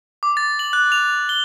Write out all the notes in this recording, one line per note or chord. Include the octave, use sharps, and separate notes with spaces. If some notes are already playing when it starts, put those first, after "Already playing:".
D6
A6
F#7
F#6
F7
G7